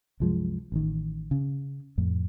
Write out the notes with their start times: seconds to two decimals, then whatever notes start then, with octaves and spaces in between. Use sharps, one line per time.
0.20 C2 F#2 F3 G#3
0.72 A1 D#3
1.31 C#3
1.98 F2 A2